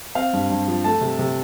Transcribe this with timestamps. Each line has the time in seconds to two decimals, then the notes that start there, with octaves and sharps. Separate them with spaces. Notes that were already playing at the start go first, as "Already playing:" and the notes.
0.15 C4 F5
0.33 G2
0.50 G2
0.68 F3
0.84 A3 A5
1.01 C3
1.19 C3